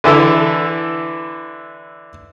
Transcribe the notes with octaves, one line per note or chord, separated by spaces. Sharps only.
D3 E3 E4 A4